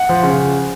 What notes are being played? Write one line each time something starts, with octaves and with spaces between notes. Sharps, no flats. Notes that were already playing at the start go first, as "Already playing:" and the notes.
Already playing: F#5
F3
C#3